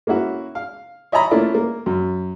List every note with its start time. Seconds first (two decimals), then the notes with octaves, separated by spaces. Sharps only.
0.07 A#3 C#4 E4 F#4
0.55 F5
1.12 C#5 D#5 E5 G#5 A#5 B5
1.31 A3 A#3 C#4 D4 E4 F4
1.54 A#3
1.86 F#2